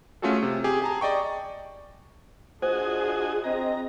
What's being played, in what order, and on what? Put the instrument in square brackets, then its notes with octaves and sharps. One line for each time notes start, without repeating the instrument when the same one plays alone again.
[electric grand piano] A3 C#4 F4 F#4 G#4 A4
C3
G4 G#4
G#4 A5 A#5
D5 D#5 G5 C#6
[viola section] D4 F4 G#4 [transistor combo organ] F#4 D#5 G#5 [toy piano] C5
[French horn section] C4 D#5 [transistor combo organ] A#5